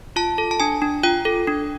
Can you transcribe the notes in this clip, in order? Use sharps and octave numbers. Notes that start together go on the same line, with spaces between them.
F4 A5
A4
A5
D4 G#5
D4
F4 G5
A4
D4